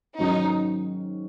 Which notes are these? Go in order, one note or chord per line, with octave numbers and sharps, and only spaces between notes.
G#2 D#3 F#3 C#4 D#4 F#4